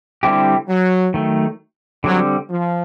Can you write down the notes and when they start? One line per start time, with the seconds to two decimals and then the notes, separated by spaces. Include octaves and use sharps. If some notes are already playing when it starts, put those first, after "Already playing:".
0.23 D3 G3 C4 E4 G4
0.69 F#3
1.14 D#3 F#3 A3
2.04 D3 F#3 G3 C4
2.50 F3